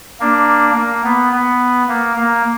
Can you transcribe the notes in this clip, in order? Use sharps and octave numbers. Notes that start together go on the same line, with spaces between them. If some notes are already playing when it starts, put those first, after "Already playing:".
A#3 D4
A#3
B3
B3
A#3
A#3